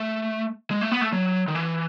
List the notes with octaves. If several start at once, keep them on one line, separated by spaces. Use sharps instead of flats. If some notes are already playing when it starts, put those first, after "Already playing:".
Already playing: A3
G#3
A3
B3
A3
F#3
D#3
E3